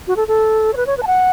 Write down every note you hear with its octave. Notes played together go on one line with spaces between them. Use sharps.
F#4
A4
A4
C#5
B4
C#5
B4
A5
F#5